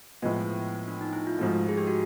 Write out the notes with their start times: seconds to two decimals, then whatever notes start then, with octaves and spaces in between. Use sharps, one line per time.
0.22 A2 F3 G#3 B3 F4
0.32 E4
0.42 F4
0.88 D4
1.01 D#4
1.13 E4
1.27 F4
1.39 G#2 F3 A3 F#4
1.69 G#4
1.78 G4
1.87 F#4